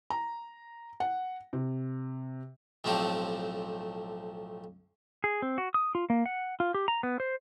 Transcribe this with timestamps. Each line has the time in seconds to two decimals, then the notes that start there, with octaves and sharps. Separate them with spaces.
0.10 A#5
1.00 F#5
1.53 C3
2.84 B1 A2 F3 A3 C4 G4
5.24 G#4
5.42 C4
5.58 F#4
5.74 D#6
5.95 F4
6.10 A#3
6.26 F#5
6.60 F4
6.74 G4
6.88 A#5
7.03 B3
7.20 C5